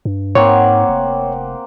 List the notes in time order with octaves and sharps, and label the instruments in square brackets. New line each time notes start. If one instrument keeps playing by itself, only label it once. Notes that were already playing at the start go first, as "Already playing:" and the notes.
[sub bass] G2
[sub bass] G#2 [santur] A#3 C4 F#5 [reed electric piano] C#5
[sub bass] F1